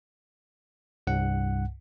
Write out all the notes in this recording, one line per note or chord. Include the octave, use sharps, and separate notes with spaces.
C2 G2 F#5